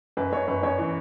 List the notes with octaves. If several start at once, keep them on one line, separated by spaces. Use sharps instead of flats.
F#2 B4
F#2 C#5
F#2 B4
F#2 C#5
E3